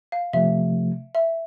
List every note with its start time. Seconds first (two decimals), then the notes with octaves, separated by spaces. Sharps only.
0.12 F5
0.33 C3 F3 A3 E5
1.15 E5